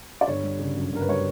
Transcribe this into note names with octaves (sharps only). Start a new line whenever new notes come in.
D5
G1 C#5
G3
C#3
F#2
G1 A#4
B4
G3 C#5